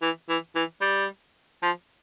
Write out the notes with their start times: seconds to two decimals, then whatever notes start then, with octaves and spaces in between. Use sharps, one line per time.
0.02 E3
0.29 E3
0.55 E3
0.81 G3
1.62 F3